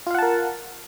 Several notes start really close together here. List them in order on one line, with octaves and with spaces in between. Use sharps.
F4 F5 F#5 A5 A#4